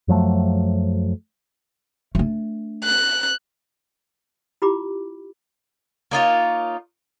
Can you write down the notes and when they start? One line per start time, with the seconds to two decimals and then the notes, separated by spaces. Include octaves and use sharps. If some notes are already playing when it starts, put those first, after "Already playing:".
0.08 F#2 F3 F#3 A3
2.15 A3 D4
2.84 F#6
4.62 E4 F4 G4 B5 D6
6.11 A#3 D#4 F4 C#5